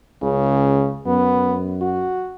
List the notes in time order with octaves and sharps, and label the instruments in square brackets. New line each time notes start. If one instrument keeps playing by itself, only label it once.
[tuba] C#2 [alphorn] C#3
[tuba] F#2 [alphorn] B3
[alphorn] F#4